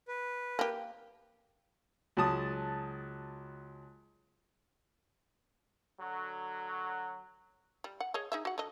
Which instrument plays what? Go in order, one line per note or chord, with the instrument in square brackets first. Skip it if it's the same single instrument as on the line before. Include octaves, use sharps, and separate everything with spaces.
[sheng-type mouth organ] B4
[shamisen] A#3 G4
[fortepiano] C#2 F#3 A5 D#6
[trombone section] D3 F#3
[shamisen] G3
F#5
G#4 C#5 D#5
D#4 G#4 E5
F#4 F#5
D3 D#5